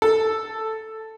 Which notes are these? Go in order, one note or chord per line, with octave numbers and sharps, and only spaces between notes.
A4